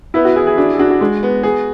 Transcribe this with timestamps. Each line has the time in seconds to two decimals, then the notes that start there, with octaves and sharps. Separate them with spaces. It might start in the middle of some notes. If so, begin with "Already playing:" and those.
0.14 B3 E4
0.25 F#4
0.36 E4 G#4
0.47 G#4
0.58 D4 F#4
0.74 G#4
0.79 D4 F#4
0.90 F#4
1.01 G#3
1.23 B3
1.43 G#4